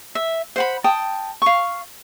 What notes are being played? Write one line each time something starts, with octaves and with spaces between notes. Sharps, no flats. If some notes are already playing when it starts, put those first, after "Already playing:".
E5
C5 F#5 B5
G5 A5 D#6
F5 C#6